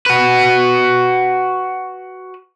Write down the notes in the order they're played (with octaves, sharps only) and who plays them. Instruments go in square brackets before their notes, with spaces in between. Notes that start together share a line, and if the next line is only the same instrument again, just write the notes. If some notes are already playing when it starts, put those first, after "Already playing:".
[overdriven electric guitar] F#4 B4